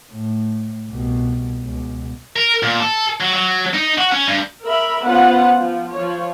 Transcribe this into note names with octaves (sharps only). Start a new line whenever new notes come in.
A2
C2 B2
C#2 B2
A#4
A#2
A4
F#3
F#3
D#4
F#4
C#4
G2
A#4 E5 B5
B3 C#4 F4 B4 C5 F#5
F3
F3 C#5